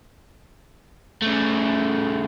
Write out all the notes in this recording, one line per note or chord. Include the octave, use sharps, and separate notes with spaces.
C#3 A3